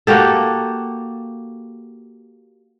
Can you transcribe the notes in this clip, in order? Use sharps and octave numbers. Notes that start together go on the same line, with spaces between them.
A#3 F#4 G4 A4